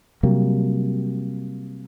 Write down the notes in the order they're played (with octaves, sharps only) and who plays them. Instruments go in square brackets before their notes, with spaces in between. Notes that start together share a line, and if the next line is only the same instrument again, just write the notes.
[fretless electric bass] C3 F#3 G3 A#3